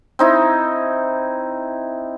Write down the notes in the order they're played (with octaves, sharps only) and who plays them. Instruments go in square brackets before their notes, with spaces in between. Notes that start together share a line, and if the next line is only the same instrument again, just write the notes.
[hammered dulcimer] C4 D#4 E4